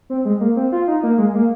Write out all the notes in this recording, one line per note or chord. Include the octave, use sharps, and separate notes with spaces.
C4
G#3
A#3
C4
F4
D#4
A#3
G#3
A#3